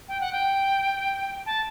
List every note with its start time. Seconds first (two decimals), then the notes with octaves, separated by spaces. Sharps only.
0.08 G5
0.20 F#5
0.32 G5
1.46 A5